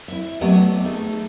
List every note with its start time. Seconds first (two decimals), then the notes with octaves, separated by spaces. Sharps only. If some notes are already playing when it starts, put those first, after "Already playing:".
0.08 E4 E5
0.41 F#3 A3 B3 G4 D5 D#5
0.85 A3 D#4 G#4